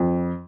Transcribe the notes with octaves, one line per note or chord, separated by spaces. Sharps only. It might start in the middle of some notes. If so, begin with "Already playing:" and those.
Already playing: F2